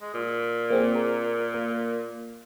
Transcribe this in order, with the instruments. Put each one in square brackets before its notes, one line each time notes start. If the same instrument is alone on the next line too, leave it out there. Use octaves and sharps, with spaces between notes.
[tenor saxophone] G#3
A#2
[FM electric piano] A#3 C4 G#4
A#4
A#3